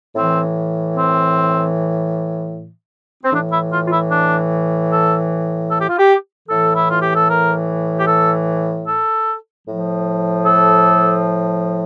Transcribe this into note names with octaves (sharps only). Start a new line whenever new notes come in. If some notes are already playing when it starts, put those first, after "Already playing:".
A2 E3 C4
C4
C4
A2 E3 D4
E4
F4
F4
E4
D4
A4
A4
G4
F4
G4
A2 E3 A4
E4
F4
G4
A4
A#4
G4
A4
A4
A2 F3
A4